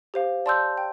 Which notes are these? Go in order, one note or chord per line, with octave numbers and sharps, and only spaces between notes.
G4 C5 F5
D5 A5 C6 E6 G6
G5